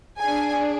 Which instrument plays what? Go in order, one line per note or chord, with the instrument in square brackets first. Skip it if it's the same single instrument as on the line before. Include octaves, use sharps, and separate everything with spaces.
[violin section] D4 G#4 G#5